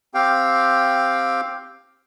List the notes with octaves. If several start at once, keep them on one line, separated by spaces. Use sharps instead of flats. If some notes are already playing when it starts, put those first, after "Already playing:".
C4 G4 F5 G5